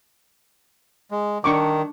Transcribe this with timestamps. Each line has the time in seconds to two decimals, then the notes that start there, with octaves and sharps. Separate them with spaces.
1.11 G#3
1.44 D#3 D4 C#6 D6